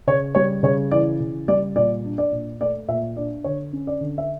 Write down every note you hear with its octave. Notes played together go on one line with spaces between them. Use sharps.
C#3 C#5
G3 C#5
C#3 C#5
E3 D5
C#3
G3 D5
A#2 D5
D4
D5
A#2
A3 D5
A#2 E5
D4 D5
D3 C#5
C#4
D5
D3
E5